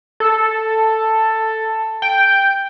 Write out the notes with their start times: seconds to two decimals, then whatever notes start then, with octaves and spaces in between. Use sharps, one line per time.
0.20 A4
2.02 G5